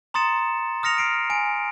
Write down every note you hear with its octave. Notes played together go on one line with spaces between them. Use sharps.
A#5 C6 D#6 A6 C#7 E7
D#6 F6 A#6 C#7 F7
F6 C7 D7
G#5 D7